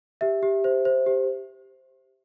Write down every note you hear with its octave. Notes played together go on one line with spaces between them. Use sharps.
G4 E5
G4
C5
C5
G4